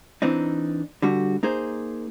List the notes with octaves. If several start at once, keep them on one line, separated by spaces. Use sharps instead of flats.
E3 C4 D4 D#4
D3 G3 F#4
A#3 D#4 G#4 C5